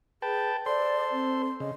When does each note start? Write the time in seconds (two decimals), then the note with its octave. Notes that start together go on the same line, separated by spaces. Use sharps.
0.22 G#4 B4 G5 A5
0.66 A4 C5 D5 C6
1.11 C4
1.60 C#3 D#5